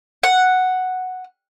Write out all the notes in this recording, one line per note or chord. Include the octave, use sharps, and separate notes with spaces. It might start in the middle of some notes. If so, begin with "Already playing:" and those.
F#5